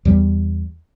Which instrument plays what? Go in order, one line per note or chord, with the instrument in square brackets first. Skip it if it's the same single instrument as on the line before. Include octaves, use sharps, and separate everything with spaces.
[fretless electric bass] E2 G3